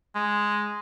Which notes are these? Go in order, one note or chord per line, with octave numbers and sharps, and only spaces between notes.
G#3